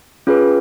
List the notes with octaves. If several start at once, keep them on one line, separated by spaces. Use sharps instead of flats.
C#4 F4 G#4 B4